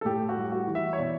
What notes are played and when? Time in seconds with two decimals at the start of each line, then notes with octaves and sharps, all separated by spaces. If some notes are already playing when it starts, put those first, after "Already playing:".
0.01 A4
0.05 A2 G4
0.29 F#4
0.36 G3
0.52 F#4
0.67 E3
0.75 E5
0.93 C#5
0.99 B2 D5